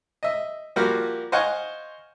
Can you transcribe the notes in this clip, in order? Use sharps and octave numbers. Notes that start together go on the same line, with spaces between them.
D#5 E5
F3 G3 A#3 F#4 F6
C5 D#5 F5 F#5 G#5 C#6